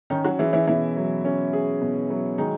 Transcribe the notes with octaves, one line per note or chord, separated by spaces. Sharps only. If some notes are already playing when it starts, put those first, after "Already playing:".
D#3 C#4 D#4
F#3 F#4
E3 E4 G#4
E3 E4
B2 E3 E4
F#3
C#4
G#4
B2
F#3
D#3 G#3 D#4